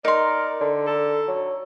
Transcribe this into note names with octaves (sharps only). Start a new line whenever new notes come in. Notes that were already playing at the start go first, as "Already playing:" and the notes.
D#4 A#4 D5 C6
D3
A4
F#3